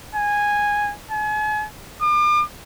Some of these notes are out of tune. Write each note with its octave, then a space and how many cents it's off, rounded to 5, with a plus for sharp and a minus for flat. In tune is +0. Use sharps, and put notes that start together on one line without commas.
G#5 -10
G#5 +40
D6 +40